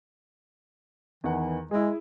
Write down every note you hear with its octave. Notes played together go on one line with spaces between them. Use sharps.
E2 D#3 E3 F#5
G#3 E4 G#4